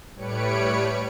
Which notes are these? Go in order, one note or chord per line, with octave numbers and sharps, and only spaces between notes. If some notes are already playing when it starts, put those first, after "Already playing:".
A2 G3 B4 C#5 C#7 D7